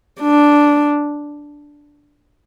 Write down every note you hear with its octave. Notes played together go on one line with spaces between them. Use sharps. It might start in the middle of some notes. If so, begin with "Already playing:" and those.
D4